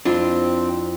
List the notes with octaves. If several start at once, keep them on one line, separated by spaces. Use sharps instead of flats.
F2 C4 D4 E4 F4